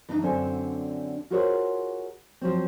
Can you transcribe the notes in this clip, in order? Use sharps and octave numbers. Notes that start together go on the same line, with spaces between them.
E3 D4 D#4
F#2 D3 C4 D4 A4 G#5
F4 F#4 G#4 A#4 C5 C#5
F3 F#3 C4